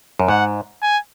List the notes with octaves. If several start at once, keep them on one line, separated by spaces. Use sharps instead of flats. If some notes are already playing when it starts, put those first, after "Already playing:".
F#2
G#2 F#5
G#5